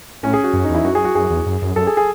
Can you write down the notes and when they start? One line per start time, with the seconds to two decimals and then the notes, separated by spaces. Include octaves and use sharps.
0.23 A2 C#4
0.34 G#4
0.44 F#4
0.53 F#2
0.64 D#4
0.70 E2
0.75 E4
0.84 F#2 F#4
0.95 G#4
1.05 F#4
1.15 F#2 G#4
1.30 E2
1.46 F#2
1.62 F#2
1.76 F#2 A4
1.87 G#4
1.97 G#4